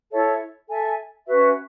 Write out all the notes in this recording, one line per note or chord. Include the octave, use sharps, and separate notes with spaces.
E4 A4 C#5 E5
A4 E5 G#5
C#4 F#4 B4 E5